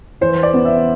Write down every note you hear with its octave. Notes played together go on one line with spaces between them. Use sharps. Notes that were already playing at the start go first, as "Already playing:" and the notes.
E2 C5
D5
B3
E5